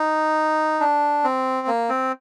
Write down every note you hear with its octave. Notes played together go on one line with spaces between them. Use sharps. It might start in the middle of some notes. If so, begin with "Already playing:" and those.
Already playing: D#4
D4
C4
A#3
C4